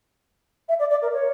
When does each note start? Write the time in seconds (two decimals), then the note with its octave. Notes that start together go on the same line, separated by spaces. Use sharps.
0.69 E5
0.79 D5
0.90 D5
1.02 A#4
1.13 C#5